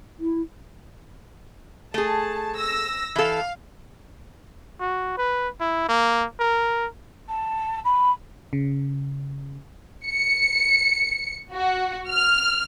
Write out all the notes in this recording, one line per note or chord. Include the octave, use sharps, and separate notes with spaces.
E4
A3 G#4 A5
E6 A#6
E3 A4 F5
F#4
B4
E4
A#3
A#4
A5
B5
C#3
C#7
F#4
F6